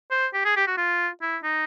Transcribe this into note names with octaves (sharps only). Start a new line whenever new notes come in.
C5
G4
G#4
G4
F#4
F4
E4
D#4